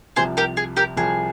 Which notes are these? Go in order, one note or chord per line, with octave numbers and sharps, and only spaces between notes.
C2 C3 F3 G#4 C5
G4 A#4
G#4
G4 A#4
C2 C3 F3 G#4